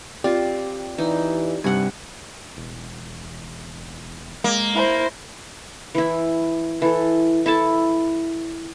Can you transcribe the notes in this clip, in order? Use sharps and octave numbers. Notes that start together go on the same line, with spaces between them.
C4 F4 G4 D5
E3 D#4
G2 C3 G3 F#5 G#5
E1
G#3 A#3
E4 C5
E3 E4
E3 A4
E4 A4 A5